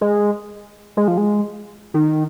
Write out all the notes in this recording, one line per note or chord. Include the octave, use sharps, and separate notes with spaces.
G#3
G#3
F3
G#3
D#3